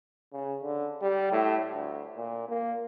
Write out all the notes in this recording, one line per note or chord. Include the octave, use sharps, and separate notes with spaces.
C#3
D3
G3
A2
D2
A#2
A#3